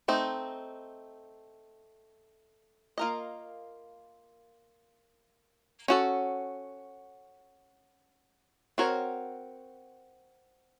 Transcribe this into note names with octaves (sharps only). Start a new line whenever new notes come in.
A3 C4 D#4
A#3 F4 A#4 D#5
C#4 F#4 A4
C4 F#4 A#4 C#5